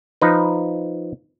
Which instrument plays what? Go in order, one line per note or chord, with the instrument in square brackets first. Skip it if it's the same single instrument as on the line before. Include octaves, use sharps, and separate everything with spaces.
[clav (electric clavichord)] F3 D#4 B4